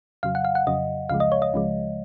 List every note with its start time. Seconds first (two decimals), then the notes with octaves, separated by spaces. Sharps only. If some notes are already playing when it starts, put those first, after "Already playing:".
0.23 F2 C#3 F#3 F5
0.35 F#5
0.45 F5
0.55 F#5
0.67 F2 C#3 F#3 D#5
1.09 C#2 C#3 F3 G#3 F5
1.20 D#5
1.32 C#5
1.42 D#5
1.54 C#2 C#3 F3 G#3